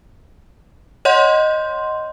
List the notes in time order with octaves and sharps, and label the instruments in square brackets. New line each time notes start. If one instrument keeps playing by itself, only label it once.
[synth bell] C#5 D#5 F#5 C6 G6